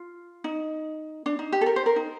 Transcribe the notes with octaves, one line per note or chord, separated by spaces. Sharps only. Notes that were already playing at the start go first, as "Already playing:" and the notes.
Already playing: F4
D#4
D4
D#4
G4
A4
A#4
C5
A#4
D#4